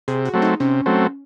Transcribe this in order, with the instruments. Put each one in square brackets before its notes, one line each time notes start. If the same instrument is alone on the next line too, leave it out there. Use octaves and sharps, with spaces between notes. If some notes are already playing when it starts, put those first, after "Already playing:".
[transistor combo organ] C3 [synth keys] G#4
[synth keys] F#4
[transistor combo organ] F#3 A3 C4
[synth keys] D#4
[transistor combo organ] C3 [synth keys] C#4
[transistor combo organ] F#3 A3 C4